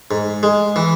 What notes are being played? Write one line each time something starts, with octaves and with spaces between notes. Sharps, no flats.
G#2
G#3
E3